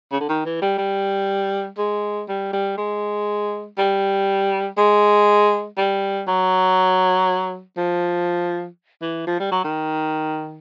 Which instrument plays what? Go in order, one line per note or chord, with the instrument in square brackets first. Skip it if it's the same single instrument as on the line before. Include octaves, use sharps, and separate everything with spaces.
[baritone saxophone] C#3
D3
D#3
E3
G3
G3
G#3
G3
G3
G#3
G3
G#3
G3
F#3
F3
E3
F3
G3
F#3
D#3